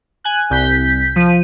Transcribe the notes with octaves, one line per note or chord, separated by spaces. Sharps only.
G#5 F#6
C2 G6 B6
F3 D#7